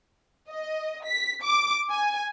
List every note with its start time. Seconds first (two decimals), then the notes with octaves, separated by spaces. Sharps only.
0.50 D#5
1.05 B6
1.43 D6
1.91 G#5